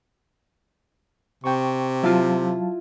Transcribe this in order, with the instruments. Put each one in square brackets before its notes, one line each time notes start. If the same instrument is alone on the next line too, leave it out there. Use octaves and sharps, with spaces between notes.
[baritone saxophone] C3 [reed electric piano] G5 C#6
[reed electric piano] F#3 F5 A5 [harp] E4 F4